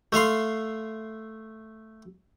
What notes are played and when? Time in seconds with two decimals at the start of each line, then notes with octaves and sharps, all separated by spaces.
0.12 A3 E5 F5 C6